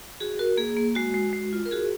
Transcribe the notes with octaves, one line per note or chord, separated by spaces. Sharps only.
F#4 G#4
F#4 A#4
A#3 G#4
A#3
G#3 F#4
G#3
G#3
F4
A#4
F#4 G#4